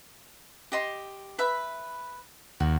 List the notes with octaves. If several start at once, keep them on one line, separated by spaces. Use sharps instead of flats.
G4 D#5 C6
B4 E5 B5
D#2 F#4